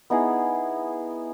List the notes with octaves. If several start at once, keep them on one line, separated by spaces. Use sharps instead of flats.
B3 D#4 E4 G#4